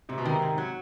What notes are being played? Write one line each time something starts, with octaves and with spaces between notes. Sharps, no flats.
G#2 C3
B2
C3 D#3
G#2
F#3